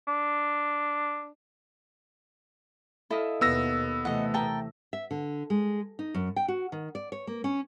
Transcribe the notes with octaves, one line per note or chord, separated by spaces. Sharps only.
D4
E4 A4 D#5 F5
D#2 B2 B3 E6 A#6
C3 E3 A3 D#5 F#5
A#4 G5 A5
E5
D3
G#3
D#4
F#2
G5
F#4
D#3
D5
C#5
A#3
C#4